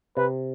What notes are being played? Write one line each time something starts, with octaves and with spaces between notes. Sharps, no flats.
C3 B4